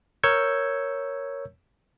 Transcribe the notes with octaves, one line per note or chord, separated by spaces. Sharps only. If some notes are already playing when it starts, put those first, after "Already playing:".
A#4 C#5 E6 G6 G#6 C#7